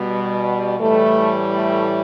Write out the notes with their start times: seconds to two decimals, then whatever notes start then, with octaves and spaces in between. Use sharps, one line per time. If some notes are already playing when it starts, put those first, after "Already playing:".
Already playing: B2 G3
0.79 A2 E3 G3 A3
1.56 A3